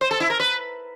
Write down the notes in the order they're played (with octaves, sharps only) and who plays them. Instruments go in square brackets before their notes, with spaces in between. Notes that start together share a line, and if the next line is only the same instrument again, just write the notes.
[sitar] C5
A4
E4
A#4
B4